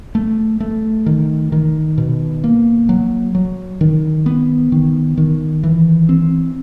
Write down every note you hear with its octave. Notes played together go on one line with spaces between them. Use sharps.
A3
A3
D#3
D#3
B2
A#3
F#3
F#3
D#3
B3
D#3
D#3
E3
C4